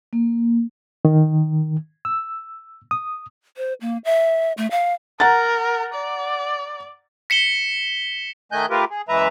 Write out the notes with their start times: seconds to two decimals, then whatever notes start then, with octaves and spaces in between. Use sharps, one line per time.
0.13 A#3
1.05 D#3
2.05 E6
2.91 D#6
3.57 C5
3.81 A#3
4.05 E5
4.57 A3
4.71 F5
5.20 A#4 F#5 A#5 A6
5.94 D5
7.30 B6 C#7 E7 G7
8.52 D#3 A3 D#5 G#5 F#6 G6
8.70 A3 F4 G4 A#4 B4
8.90 G#4
9.09 F#2 E3 G#3 B4 E5 A#5